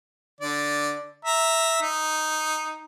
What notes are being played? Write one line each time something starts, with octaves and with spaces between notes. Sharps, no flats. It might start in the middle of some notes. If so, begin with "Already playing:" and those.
D3 D5
E5 A#5
D#4